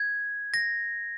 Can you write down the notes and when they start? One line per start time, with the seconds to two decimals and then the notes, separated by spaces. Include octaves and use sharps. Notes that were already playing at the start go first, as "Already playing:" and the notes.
Already playing: G#6
0.54 A#6